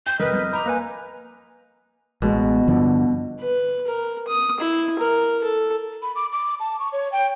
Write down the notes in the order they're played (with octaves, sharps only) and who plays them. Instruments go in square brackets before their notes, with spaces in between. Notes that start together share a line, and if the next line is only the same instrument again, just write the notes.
[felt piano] G5 [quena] G6
[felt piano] F1 F6 [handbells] A#4 [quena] B4 [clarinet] D#5
[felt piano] F2 G6
[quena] A#5 [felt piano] B5 D6
[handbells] A#3 B4 G#5
[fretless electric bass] A1 G#3 [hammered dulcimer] B2
[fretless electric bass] G2 D3 F3
[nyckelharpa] B4
A#4
D#6
E4
A#4
A4
[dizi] B5
D6
D6
A5
C#6
C#5
G5